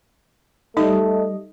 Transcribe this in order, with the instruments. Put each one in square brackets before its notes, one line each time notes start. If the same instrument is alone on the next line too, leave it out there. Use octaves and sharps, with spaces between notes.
[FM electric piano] G3 D#5 [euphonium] A3 [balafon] D#4